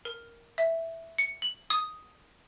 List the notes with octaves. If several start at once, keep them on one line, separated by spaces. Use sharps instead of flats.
A#4
E5
C#7
F#7
D#6